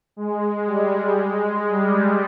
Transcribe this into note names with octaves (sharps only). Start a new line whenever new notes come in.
G#3
G3
G#3
G3